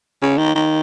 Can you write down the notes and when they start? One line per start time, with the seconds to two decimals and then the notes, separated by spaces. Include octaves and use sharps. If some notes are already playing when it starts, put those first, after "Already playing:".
0.22 C#3
0.38 D#3
0.55 D#3